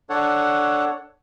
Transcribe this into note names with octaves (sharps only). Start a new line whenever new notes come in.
D4 A4 C#5 F#5